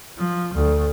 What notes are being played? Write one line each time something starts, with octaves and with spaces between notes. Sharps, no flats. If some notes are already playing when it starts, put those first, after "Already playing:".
F3
D2